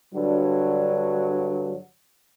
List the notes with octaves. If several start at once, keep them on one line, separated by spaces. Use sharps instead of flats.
G2 D3 F#3